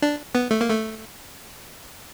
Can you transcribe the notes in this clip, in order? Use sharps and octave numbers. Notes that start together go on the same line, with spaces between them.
D4
B3
A3
A#3
A3